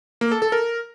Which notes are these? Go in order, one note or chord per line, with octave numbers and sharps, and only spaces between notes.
A#3
A4
A4
A#4